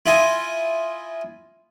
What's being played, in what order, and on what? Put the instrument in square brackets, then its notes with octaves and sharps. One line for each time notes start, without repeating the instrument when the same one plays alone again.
[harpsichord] E4 F4 D#5 G#5